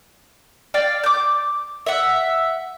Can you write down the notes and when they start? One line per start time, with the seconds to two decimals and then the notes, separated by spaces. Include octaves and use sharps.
0.74 D5 F5 G5
1.04 D6 G6
1.86 E5 F#5